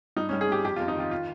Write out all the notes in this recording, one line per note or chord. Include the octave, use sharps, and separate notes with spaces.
G2 D#4
C#4
G2
G#4
G2 G4
F2 G4
F4
F2
D#4
D#3 F4
F4